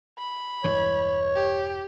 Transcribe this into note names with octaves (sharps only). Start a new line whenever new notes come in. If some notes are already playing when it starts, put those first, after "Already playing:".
B5
E1 G2 E3 C#5
G4